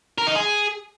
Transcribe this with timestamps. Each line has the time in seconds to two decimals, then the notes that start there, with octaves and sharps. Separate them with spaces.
0.18 A#4
0.27 D#4
0.35 G#4